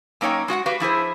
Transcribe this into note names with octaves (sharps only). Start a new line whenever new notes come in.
F#2 A#3 D#4 C#5 D#5 G5
G#3 F#4 F5 F#5
F#4 G4 B4 F5
F3 E4 G#4 C5